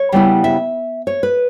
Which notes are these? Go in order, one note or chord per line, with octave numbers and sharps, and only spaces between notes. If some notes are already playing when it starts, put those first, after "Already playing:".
Already playing: C#5
C#3 G3 B3 E4
E5
C#5
B4